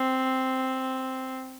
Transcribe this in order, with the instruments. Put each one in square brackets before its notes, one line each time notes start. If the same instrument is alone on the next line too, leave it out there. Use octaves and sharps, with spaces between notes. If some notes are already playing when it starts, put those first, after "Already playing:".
Already playing: [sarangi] C4